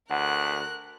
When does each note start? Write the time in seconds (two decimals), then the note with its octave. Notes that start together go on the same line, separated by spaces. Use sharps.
0.11 D2 A#4 F#5 F#6